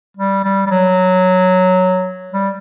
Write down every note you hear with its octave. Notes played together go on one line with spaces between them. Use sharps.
G3
G3
G3
F#3
G3